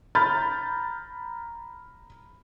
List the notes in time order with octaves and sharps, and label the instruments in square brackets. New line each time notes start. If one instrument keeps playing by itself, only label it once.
[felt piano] A#5 B5 F6 G6 A6